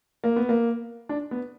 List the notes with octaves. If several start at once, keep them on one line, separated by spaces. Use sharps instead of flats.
A#3
B3
A#3
D4
B3